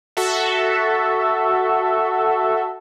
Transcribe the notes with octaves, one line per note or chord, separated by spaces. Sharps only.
F#4 A4 E5